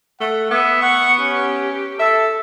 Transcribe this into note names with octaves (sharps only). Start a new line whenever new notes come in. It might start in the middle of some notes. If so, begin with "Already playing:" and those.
A3 F#5
B3 E5
F#5 C#6
C#4 G4
A4 E5